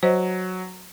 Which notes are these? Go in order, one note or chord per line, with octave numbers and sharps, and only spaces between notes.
F#3 C5 D#5